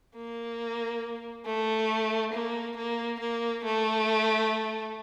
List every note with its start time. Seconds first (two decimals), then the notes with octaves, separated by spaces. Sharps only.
0.15 A#3
1.46 A3
2.33 A#3
2.76 A#3
3.20 A#3
3.64 A3